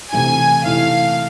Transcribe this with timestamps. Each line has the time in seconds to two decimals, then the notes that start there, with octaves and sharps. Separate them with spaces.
0.13 C3 E3 A3 E4 G#5
0.65 C3 E3 A3 E4 F5